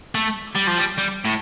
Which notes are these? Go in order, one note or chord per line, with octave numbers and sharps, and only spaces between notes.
A3
G3
F3
G3
G3
A2